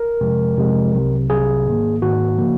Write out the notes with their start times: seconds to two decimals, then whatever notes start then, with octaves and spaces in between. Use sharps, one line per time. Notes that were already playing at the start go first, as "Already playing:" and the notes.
Already playing: A#4
0.21 F2 C3 F3 G#3
0.57 F2 C3 F3 G#3
0.93 C2 C3 F#3
1.29 C2 C3 F#3 G#4
1.66 G#2 D#3 A#3
2.02 G#2 D#3 A#3 F#4
2.38 C#3 F3 A#3